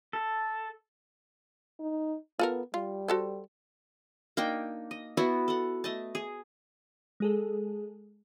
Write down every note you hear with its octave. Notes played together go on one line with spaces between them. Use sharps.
A4
D#4
B3 F4 A4 A#4
G3 F4
F#4 A4 C5
A#3 D4 D#4 G5
D#5
B3 E4 F#4
A4 F#5
A3 D#5 A5
G#4
G#3 G#4 A4